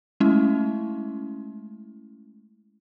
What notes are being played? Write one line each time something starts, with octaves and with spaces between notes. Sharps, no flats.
G#3 A3 C#4 E4